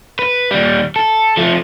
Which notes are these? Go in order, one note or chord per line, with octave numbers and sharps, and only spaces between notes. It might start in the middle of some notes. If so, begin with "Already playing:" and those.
B4
D#2 G3
A4
F3 A3